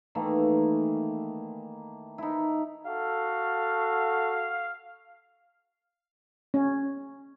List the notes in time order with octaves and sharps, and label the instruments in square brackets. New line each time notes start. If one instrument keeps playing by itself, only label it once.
[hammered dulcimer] D#3 E3 A3 A#3
D#4 E4
[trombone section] F#4 A4 [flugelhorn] F5
[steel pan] C#4